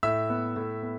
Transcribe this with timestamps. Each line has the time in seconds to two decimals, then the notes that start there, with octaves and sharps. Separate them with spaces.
0.03 A2 E5 E6
0.30 B3
0.56 A2
0.83 B3